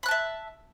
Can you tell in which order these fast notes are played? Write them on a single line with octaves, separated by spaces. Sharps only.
B5 F#6 A5 E5